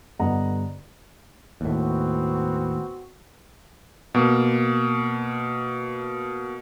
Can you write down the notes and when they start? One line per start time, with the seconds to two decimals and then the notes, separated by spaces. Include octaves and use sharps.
0.19 G2 D3 B3 D#5 F#5 A#5
1.61 D#2 A2 B3 C4 F#4
4.14 B2 A#3